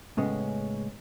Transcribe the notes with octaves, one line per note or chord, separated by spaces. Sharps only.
A2 C#3 G#3 B3 C#4